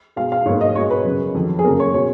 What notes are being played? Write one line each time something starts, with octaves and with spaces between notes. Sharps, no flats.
B2 G#3 F5
F5
G#2 F#3 A#3 C#5
D#5
B2 G#3 C#5
B4
F#2 C#3 G#3
F2 D#3 F#3
G#4
F#2 C#3 F#3 A#3 A#4
C#5
B2 G#3 C#5